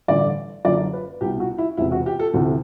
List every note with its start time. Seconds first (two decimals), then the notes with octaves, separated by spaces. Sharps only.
0.08 A1 G2 D3 D5
0.65 F#1 F#2 D3 D5
0.93 B4
1.21 C2 B2 G4
1.40 F#4
1.58 E4
1.77 E1 E2 C3 E4
1.92 F#4
2.06 G4
2.20 A4
2.34 D2 C3 E3